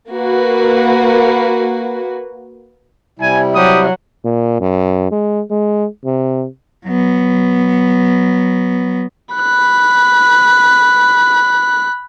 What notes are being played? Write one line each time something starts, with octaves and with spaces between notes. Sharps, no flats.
A#3 F#4 B4
C3 G3 E4 G#5
F#3 G4 D#6
A#2
F#2
G#3
G#3
C3
F#3 B3
B5 F#6